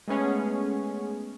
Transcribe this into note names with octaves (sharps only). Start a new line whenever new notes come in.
G#3 A3 B3 C#4 G#4 C#5